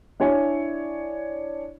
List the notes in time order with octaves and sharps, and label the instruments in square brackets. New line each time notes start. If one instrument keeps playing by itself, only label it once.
[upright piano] D4 E4 C#5 G#5